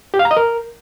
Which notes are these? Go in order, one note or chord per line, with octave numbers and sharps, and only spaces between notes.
G4
F5
A#5
D#5
A#4